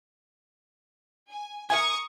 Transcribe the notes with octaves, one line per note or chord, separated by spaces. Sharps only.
G#5
A#4 E5 G#5 A#5 C#6 D#6